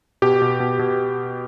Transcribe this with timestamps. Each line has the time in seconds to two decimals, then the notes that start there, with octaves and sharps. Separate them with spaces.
0.22 B2 G4
0.42 B2
0.60 B2
0.79 B2